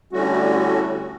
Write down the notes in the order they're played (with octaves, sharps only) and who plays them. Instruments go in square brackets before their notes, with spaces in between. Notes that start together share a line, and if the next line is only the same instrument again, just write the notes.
[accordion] A2 D3 G3 A3 C#4 F#4